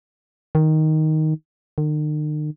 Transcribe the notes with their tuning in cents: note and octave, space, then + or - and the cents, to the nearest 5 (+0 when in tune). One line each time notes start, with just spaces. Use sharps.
D#3 +5
D#3 -45